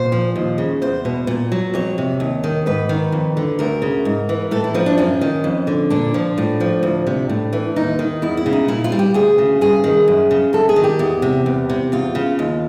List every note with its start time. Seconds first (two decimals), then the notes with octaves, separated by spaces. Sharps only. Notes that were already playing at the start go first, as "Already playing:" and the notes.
Already playing: A#2 C5
0.12 F3
0.36 D#2
0.58 C#3
0.82 E2 C5
1.05 B2
1.27 A#2
1.52 F#3
1.74 F2 C#5
1.98 C3
2.20 D#2
2.44 D#3
2.66 G#2 B4
2.89 D#3
3.12 F2
3.37 D3
3.59 D2 A#4
3.82 C#3
4.05 G#2
4.29 E3
4.51 A2 A4
4.64 E4
4.74 F3 D#4
4.86 D4
4.98 F#2 C#4
5.21 D#3
5.44 F2
5.67 D3
5.90 A#2 D4
6.14 F3
6.38 A2
6.60 F3
6.83 D2
7.07 C3
7.29 A2
7.53 E3
7.76 D#2 D#4
7.99 D#3
8.22 E2 E4
8.37 E4
8.46 C#3
8.53 D#4
8.68 A#2 E4
8.84 F4
8.92 G3
8.99 G4
9.14 D2 G#4
9.38 C#3
9.61 G2 G#4
9.84 D#3
10.08 F#2
10.31 C#3
10.53 F#2 A4
10.69 G#4
10.76 D#3
10.84 G4
10.99 E2
11.22 C3
11.46 E2
11.69 C3
11.92 E2 F4
12.15 C#3
12.39 D#2